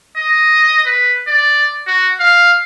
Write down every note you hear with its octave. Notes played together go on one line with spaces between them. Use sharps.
D#5
B4
D5
F#4
F5